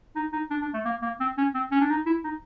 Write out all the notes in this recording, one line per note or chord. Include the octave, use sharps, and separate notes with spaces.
D#4
D#4
D4
D4
A3
A#3
A#3
C4
C#4
C4
C#4
D4
D#4
E4
D#4